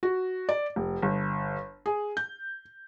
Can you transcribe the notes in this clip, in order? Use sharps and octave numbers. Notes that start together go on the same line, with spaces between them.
F#4
D5
F1
G1
G#4
G6